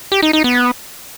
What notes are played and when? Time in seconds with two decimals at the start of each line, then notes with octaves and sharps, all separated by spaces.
0.12 G4
0.23 D#4
0.33 D#4
0.44 B3